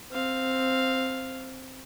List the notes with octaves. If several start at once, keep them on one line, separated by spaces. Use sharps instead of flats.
C4 F5